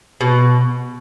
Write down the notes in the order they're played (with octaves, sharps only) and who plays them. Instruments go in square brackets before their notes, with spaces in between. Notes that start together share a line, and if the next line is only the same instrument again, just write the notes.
[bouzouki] B2